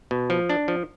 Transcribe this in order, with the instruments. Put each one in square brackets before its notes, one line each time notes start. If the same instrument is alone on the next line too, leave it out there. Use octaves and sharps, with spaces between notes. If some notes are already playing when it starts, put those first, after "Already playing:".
[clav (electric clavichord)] B2
F3
D4
F3